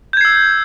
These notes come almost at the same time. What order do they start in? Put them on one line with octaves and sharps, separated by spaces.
G6 G#6 C7 E6